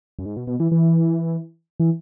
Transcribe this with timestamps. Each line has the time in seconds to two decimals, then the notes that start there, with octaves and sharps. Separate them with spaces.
0.19 F#2
0.26 G#2
0.37 B2
0.47 B2
0.60 E3
0.72 E3
1.80 E3